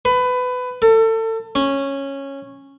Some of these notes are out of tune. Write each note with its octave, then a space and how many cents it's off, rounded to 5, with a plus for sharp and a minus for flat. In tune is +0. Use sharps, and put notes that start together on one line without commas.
B4 +20
A4 +30
C#4 -10